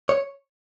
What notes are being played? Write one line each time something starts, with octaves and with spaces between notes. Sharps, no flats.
C#5